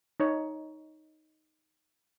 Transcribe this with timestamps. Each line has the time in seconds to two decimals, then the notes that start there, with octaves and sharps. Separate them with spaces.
0.20 D#4 C#5